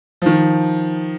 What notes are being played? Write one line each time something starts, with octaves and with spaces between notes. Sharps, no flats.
D#3 F3